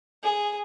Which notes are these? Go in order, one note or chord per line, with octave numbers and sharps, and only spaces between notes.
G#4